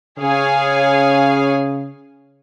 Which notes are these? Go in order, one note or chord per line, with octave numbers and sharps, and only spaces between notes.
C#3 G#4 C#5 F5 G#5